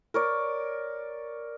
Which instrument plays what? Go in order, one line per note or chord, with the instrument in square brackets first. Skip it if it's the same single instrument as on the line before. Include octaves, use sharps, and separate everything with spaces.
[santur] A#4 C#5 D5